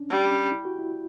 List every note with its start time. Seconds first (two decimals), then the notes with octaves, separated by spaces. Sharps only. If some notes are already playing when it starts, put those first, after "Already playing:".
Already playing: C#4 D4
0.10 G3
0.31 C#4
0.52 E4
0.65 F#4
0.79 E4